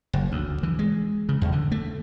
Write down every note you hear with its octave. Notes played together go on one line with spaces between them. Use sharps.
F#1
D2
E3
G#3
C#3
E2
D3
A3